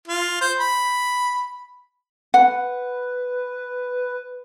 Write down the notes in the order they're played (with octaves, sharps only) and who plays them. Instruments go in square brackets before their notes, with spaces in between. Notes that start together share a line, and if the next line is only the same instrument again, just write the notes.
[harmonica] F4
C5
B5
[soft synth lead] B4 [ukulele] F#5